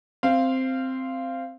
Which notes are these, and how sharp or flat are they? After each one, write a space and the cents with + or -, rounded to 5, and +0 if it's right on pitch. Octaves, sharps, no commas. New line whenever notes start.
C4 +0 F5 -15